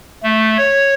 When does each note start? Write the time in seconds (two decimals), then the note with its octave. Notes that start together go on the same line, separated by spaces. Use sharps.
0.23 A3
0.57 C#5